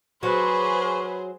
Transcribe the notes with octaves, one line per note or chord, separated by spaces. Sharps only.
F#3 G#4 B4 C5 C#6